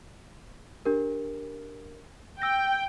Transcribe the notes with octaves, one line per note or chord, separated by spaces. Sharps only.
D4 G4 A#4
G5 E6 A#6